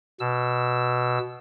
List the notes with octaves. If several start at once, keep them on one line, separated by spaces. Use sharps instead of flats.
B2 E6